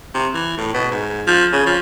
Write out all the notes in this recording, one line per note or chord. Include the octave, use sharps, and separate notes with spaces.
C3
E3
A2
B2
G#2
F3
C#3
F3